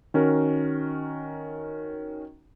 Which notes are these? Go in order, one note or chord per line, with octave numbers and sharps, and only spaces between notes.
D#3 C#4 F#4 A#4